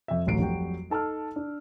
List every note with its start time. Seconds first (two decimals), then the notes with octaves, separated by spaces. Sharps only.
0.08 F2 E5
0.27 D1 A1 F#3 C7 D7
0.38 F2 F#3 G3 F#4 G5
0.90 D#4 A4 A5 E6 F6
1.36 D4